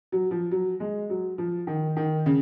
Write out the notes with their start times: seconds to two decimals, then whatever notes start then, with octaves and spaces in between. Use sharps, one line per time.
0.12 F#3
0.31 F3
0.51 F#3
0.80 G#3
1.10 F#3
1.38 F3
1.67 D#3
1.97 D#3
2.26 C#3